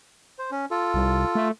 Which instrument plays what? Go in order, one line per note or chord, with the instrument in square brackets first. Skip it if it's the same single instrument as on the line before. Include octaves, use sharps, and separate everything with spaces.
[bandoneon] C5
C#4
F4 A4
[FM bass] C2
A3